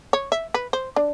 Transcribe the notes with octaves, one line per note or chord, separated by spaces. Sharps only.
C#5
E5
B4
C5
D4